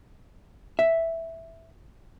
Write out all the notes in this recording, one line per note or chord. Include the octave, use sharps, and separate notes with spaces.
E5